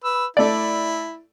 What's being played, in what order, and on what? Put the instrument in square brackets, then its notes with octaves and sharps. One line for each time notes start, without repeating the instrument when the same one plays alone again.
[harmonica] B4 E6
[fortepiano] A3 D5 [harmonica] E4